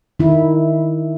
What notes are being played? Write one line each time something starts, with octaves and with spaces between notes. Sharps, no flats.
D#3 E4